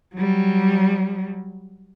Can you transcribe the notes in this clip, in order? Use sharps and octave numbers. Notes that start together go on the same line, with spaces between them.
F#3 G3